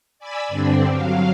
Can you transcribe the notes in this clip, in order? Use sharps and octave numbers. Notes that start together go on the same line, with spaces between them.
D5 G#5 B5 E6
G2 D3 C4 D4
F#3 F5